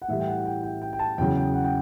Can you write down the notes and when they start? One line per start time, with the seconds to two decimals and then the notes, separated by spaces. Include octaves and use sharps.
0.02 F#5
0.08 A2 E3 G3 E5
0.20 G5
0.28 F#5
0.46 G5
0.63 G5
0.82 G5
0.93 G5
0.99 A5
1.18 E2 C#3 F#3 G5
1.37 G5
1.54 F#5
1.64 G5